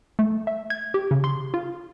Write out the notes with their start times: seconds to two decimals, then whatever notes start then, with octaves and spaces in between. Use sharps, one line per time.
0.19 A3
0.47 E5
0.70 G#6
0.94 G4
1.11 C#3
1.24 C6
1.54 F4